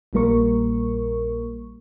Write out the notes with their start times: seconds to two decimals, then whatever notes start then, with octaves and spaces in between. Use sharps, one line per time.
0.13 A#1 A#2 G3 A#3 A#4 C#6